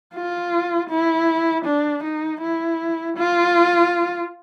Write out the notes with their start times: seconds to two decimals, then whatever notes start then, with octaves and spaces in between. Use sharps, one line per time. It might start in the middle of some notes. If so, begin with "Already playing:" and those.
0.15 F4
0.90 E4
1.65 D4
2.04 D#4
2.41 E4
3.17 F4